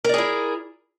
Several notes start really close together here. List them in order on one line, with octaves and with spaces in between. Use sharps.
A#4 D5 G#4 E4